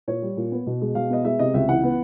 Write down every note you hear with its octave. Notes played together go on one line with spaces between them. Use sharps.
A#2 C#5
G3
A#2
B3
B2
G#3
B2 F5
B3 D#5
G#3 E5
C3 D#5
C#2 E5
E3 F#5
B3